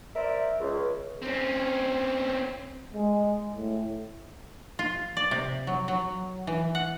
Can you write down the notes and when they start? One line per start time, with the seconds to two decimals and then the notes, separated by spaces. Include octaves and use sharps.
0.15 A#4 C5 D5 E5
0.60 C#2
1.22 C4 C#4
2.94 G#3
3.56 A2
4.79 F4
5.17 D5
5.31 C3
5.67 F#3
5.88 F#3
6.47 E3
6.75 F#5